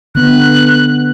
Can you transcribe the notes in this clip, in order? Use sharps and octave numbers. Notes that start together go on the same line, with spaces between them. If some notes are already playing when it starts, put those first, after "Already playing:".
D3 B3 F#6